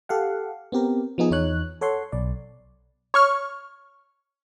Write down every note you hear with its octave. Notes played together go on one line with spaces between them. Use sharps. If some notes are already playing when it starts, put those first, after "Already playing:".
G4 A4 F5 F#5
B3 C4 G4 A#4
F3 B3 D#4 G#4
E2 D#4 C#5 F#6
A4 C#5 F#5 C6
B1 D5
C#5 C#6 F6